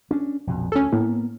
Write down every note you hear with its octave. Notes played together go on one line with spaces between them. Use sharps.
C#4 D4
A#1 F2 B2
D2 C#4 A4
A2 A#3 B3